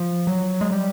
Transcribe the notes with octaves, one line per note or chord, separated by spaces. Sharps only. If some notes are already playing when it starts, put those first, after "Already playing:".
Already playing: F3
F#3
G#3
G3